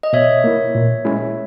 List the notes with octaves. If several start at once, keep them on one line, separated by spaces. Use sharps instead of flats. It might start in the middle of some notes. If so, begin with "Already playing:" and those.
D#5
B2 C#5 E5
A#3 E4
A#2
G#3 C#4 E4